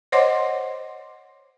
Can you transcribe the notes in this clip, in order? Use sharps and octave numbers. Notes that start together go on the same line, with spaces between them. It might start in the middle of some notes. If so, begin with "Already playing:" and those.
C5 C#5 D#5 F#5 C6 D6